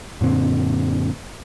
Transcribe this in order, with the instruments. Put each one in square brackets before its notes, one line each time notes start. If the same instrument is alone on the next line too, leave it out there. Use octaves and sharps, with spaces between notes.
[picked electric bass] F#2 A#2 D3 C4